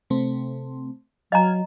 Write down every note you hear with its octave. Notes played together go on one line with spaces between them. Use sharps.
C3 A3 C4
F#3 D#5 F5 G#5 A#5